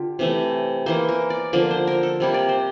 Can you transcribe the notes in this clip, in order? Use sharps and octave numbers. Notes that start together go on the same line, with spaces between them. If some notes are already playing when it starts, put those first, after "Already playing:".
Already playing: D3 F4 G4
C3 E3 A3
E3 A#3 C5
A#4
D5
D3 F3 A#3 D5
C5
A#4
A4
C3 G3 A#3
D5
C5